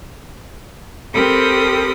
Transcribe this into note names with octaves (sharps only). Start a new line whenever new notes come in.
C4 G4 A4 A#4 B5 D#6